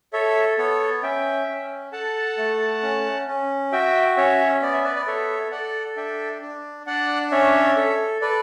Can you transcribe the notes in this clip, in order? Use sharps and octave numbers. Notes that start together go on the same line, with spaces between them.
A4 C#5 E5
B3 A4 C#5
C#4 E5 G5
C#4
A4 F#5 A5
A3
C#4
C#4
F#4 E5 G5
C#4 C#5 E5
B3 D5
E5
B4 D5
D5
A4 C#5 E5
A4 D5 F#5
D4 E5 G5
D4
D4 D5 F#5
C#4 C#5 E5
A4
A4 B4 D5